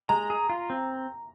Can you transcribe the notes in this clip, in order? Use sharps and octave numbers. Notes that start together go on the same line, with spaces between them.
G#3 A#5
G#4
F4
C4